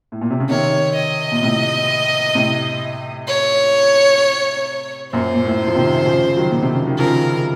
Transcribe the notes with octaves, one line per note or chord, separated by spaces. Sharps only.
A2
A#2
C3
C#3
C3 D#3 C#5
D#5
A#2
A2 C3
A2 C3
C#5
F#2 A#2 C5
A#2
A2
F3
C3 D#3
C#3 F3
D#3 F#3
A#2
C3
C#3
D#3
C#3 F3 A#4